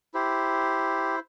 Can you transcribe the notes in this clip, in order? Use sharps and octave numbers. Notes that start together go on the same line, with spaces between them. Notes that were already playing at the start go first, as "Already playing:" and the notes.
E4 G4 C5